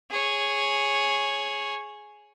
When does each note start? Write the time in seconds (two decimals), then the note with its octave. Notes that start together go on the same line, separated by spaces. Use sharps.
0.11 G#4 C#5